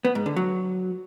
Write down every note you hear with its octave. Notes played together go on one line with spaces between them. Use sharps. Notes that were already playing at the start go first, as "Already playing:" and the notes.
B3
G#2
D3
F#3